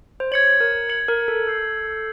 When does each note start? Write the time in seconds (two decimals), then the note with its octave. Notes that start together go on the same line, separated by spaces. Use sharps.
0.20 C5
0.32 C#5 G#6 C#7 F#7
0.60 A#4
0.89 G#6 C#7 F#7
1.08 A#4
1.28 A4
1.47 E6 G6 C7